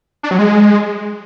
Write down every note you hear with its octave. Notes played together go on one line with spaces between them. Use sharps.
D4
F#3
G#3